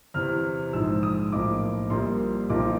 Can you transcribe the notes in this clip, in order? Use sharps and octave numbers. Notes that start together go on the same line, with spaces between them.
E2 C3 E3 F6
A#1 G#2 F3 G#3 E6
D#6
B1 A2 F3 A#3 D6
A#1 A#2 G3 A#3 C6
B1 A#2 F3 A#3 D6